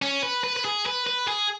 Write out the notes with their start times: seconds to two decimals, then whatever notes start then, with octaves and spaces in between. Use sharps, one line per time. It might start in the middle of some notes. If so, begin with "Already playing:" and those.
0.02 C#4
0.23 B4
0.44 B4
0.56 B4
0.65 G#4
0.86 B4
1.07 B4
1.28 G#4